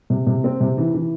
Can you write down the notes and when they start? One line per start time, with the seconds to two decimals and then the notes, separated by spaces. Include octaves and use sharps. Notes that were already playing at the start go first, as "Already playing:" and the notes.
0.10 C3
0.27 C3
0.44 C4
0.61 C3
0.77 E3
0.94 E3